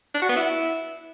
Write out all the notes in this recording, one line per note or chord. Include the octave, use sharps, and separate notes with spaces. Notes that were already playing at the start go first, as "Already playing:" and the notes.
D4
F#4
B3
E4